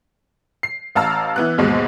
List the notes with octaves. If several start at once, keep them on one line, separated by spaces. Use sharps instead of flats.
C7
A1 F5 A5 A#5 E6 F6
E3 B3 F#6
D#2 G#2 B2 G#3